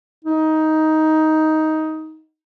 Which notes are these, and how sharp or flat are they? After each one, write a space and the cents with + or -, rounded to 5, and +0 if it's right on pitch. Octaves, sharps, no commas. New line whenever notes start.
D#4 +10